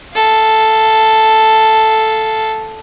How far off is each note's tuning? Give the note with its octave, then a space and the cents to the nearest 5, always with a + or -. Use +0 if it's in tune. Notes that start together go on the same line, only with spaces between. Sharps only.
A4 +0 F5 -10